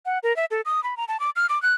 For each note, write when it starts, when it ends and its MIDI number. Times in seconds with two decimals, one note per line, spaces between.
0.06 0.19 78
0.23 0.35 70
0.36 0.45 76
0.51 0.61 69
0.65 0.83 87
0.84 0.97 83
0.97 1.05 82
1.08 1.20 81
1.20 1.30 86
1.36 1.46 89
1.49 1.61 86
1.62 1.75 90